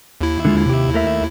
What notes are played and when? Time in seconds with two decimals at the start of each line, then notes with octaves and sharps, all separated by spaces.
0.21 D#2 E4
0.45 D3 G#3 F4
0.66 C3 G4
0.94 A3 A#4 E5